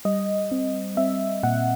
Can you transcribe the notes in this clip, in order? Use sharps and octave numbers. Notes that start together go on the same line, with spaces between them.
G3 D#5
C4
C4 E5
A#2 F#5